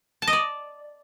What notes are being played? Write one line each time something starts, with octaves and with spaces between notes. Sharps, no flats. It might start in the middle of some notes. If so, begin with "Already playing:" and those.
A5
D#5
D5